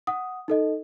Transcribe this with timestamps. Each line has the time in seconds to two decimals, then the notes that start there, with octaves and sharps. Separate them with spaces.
0.07 F#5 D#6
0.48 D#4 A4 D#5